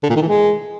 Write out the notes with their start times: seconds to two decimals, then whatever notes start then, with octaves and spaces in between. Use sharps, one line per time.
0.03 D3
0.10 A#2
0.16 D#3
0.22 E3
0.28 G#3